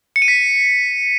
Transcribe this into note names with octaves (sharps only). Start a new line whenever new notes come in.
C#7
D#7
B6